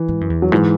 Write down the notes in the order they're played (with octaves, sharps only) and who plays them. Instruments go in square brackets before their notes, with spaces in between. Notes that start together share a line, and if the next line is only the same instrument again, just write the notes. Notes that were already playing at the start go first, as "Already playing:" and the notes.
Already playing: [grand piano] E3
[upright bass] G#2
F#2
E2
[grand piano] F#3
[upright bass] G#2 [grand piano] E3